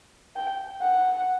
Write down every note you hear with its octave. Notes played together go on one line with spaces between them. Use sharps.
G5
F#5